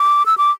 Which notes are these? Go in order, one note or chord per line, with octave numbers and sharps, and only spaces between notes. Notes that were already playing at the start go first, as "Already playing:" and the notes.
Already playing: D6
E6
D6